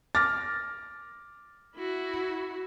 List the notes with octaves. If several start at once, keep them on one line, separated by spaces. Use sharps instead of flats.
D6 F6 A6 A#6
E4 F#4